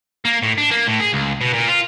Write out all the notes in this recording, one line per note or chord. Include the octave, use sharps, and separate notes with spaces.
A#3
A2
D4
A#3
A2
G#4
C#2
B2
A#2
F4